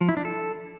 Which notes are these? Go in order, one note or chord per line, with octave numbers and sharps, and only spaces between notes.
F3
E4
D4
A4